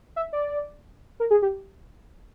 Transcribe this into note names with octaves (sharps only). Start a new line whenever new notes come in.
E5
D5
A#4
G#4
G4